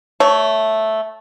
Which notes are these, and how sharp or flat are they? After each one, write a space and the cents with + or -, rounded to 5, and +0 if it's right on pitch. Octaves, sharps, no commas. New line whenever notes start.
A3 -5 C#5 +15